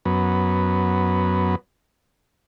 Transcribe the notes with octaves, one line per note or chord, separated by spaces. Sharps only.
F#2 B3